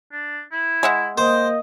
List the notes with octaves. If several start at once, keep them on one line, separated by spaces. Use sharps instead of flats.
D4
E4
G#3 E5 F#5
A#3 C5 D#5 G5